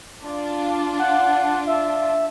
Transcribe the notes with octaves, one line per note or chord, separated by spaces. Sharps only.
D4 F4
F#5
E5